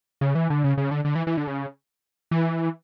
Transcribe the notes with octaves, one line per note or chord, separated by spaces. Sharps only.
C#3
E3
D3
C#3
C#3
D3
D3
E3
E3
D3
C#3
E3